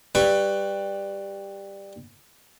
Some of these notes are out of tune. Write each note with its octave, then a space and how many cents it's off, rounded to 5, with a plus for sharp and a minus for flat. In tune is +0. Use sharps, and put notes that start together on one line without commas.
G3 +10 B4 +5 C#6 +0